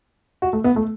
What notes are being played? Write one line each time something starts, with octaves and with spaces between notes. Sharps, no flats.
F#4
A3
B3
A3